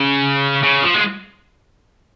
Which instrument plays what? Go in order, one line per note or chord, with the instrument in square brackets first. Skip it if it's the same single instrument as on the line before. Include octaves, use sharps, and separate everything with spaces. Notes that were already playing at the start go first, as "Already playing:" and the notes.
Already playing: [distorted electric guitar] C#3
C#3
F3
G#3